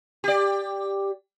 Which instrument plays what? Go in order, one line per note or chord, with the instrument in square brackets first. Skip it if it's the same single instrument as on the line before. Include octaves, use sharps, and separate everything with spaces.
[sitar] G4 D5